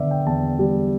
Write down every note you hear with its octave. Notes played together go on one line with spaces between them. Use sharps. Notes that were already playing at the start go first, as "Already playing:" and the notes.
Already playing: D3 B3 D5 E5
G5
E2 A5
G3